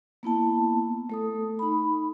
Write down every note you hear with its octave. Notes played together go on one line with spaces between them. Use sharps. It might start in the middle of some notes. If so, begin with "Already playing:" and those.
A#3 B3 E4 A5
A3 A4 D#6
D#4 B5